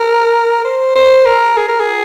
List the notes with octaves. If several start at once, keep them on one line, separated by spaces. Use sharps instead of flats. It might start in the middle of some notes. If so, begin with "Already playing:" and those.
Already playing: A#4
C5
C5
A#4
G#4
A#4
G#4